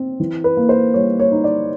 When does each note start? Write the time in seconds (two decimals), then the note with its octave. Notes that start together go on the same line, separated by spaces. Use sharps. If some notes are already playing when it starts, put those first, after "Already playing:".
Already playing: C4
0.20 E3
0.44 B4
0.57 A#3
0.69 C5
0.94 G3 C#5
1.19 C#5
1.32 D#4
1.44 D5